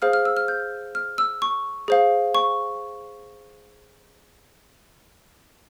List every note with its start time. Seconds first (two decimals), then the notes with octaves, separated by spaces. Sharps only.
0.02 G#4 C5 F5 F6
0.13 F6
0.25 E6
0.37 F6
0.48 G6
0.95 F6
1.18 E6
1.42 C#6
1.88 G#4 C5 F5
2.35 C#6